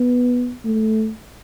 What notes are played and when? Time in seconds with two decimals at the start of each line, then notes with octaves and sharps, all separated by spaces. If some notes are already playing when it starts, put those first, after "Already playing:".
Already playing: B3
0.65 A3